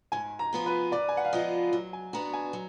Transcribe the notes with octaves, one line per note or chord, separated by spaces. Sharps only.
G#2 G#5
A#5
F3 B3 F4
B4
G#2 D5
G#5
F#5
F5
F3 B3 F4 D#5
F#3
G#5
B3 D4 F#4 A#5
G#5
F#3